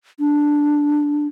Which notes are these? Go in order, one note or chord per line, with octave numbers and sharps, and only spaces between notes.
D4